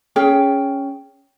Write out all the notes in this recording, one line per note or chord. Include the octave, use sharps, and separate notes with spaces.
C#4 G#4 G5